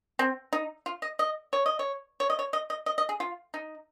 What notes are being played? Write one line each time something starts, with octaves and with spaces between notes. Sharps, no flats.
C4
D#4
F4
D#5
D#5
C#5
D#5
C#5
C#5
D#5
C#5
D#5
D#5
D#5
D#5
G#4
F4
D#4